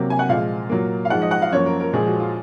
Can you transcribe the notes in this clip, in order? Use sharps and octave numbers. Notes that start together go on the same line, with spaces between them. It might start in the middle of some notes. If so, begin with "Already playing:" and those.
Already playing: C3 F#3 A#3
G#5
F#5
A#2 F3 G#3 F5
A#2 F#3 A#3
F5
G#2 F3 G#3 F#5
D#5
F#5
F5
F#2 F3 A#3 C#5
A#4
A#4
A#2 F3 G#3 G#4
F#4
F4